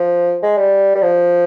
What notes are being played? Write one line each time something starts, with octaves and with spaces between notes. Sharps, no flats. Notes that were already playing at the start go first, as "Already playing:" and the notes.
Already playing: F3
G#3
G3
G3
F3